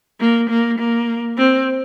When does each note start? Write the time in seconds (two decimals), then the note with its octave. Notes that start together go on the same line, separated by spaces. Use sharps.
0.20 A#3
0.50 A#3
0.79 A#3
1.38 C4